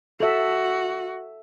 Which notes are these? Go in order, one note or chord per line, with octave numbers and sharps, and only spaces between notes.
F#4 A4 E5